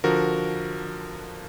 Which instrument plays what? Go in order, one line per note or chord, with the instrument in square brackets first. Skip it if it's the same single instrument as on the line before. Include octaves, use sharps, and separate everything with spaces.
[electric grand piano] D3 F3 F#4 A#4